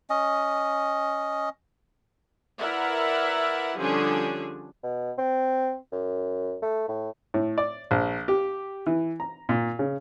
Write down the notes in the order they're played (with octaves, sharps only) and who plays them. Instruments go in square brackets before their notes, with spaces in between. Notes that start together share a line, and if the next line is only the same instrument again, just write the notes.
[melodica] C#4 D#5
[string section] E4 A#4 B4 D5 E5 F#5
D3 F3 G3 C#4 D4 G#4
[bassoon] B2
C4
F#2
A3
A2
[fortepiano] A2
D5
A#1
G4
E3
A#5
A#2
C#3